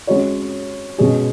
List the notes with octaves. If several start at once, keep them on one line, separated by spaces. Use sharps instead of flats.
G#3 C#4 F#4 C#5
B2 G#3 C#4 G#4